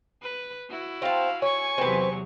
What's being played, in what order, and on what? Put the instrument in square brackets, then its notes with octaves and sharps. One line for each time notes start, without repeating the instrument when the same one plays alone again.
[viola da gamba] B4
E4 F#4
[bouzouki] C4 A5 [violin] F5
[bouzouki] C#5 [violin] G#5 C#6
[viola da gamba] E2 C3 F#3 [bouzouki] C4 B4